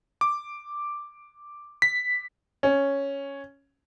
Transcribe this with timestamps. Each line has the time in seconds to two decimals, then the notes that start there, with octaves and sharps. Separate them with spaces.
0.21 D6
1.82 B6
2.63 C#4